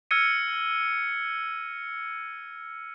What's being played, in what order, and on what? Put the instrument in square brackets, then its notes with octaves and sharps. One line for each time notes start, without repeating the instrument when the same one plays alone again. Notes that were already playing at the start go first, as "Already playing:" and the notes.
[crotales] E6 F6 G#6 A#6 C#7 D#7